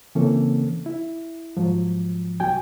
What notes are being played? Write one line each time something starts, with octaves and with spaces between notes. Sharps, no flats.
C#3 E3 A#3 C4 C#4 A4
E4
G#2 F3 F#3
C2 F#3 F#4 G5 G#5